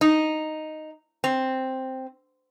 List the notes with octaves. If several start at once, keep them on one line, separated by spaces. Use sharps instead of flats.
D#4
C4